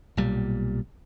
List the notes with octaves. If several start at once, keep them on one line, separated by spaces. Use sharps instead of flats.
B1 A#2 G3